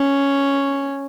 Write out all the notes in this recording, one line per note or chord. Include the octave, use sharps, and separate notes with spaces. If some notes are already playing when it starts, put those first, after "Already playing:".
Already playing: C#4